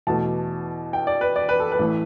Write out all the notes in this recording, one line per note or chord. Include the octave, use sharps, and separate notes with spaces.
E2 B2 A3 A5
G5
D5
B4
D5
B4
A4
B4
A1 E3 A3